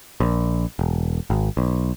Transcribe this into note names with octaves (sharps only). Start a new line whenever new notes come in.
A#1
E1
G#1
B1